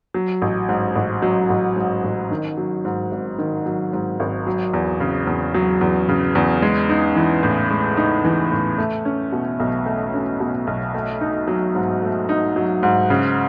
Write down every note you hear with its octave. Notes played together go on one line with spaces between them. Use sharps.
F#3
A1
G#2
A1
F#3
A1
G#2
A1
D#3
F#3
G#2
G#1
D#3
F#3
G#2
G#1
F#3
E2
C#3
E2
F#3
E2
C#3
E2
G#3
D#4
E3
A2
G#3
D#4
E3
A2
A3
C#4
B2
B1
A3
C#4
B2
B1
A3
D#4
F#3
G#2
A3
D#4
F#3
G#2
C#3